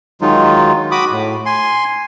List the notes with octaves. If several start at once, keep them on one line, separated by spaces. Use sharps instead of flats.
D#3 F#3 G#3 D#4 F4
F#4 B5 D6 D#6
A2
G#5 C6